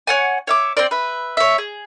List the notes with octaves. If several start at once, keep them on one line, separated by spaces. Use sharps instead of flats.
C#5 F#5 G#5
C#5 E5 D6
C4 C5 D5
B4 E5
C#5 E5
G#4